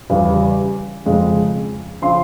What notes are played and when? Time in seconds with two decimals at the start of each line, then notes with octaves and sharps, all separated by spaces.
0.10 E2 C#3 G3
1.06 F2 C#3 F3 G#3
2.02 C#3 F3 C6